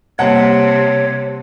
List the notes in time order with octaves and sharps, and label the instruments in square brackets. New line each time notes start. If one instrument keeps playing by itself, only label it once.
[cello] C3 [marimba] G3 A#3 D#5 [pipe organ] C#5 [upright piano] F#5 A5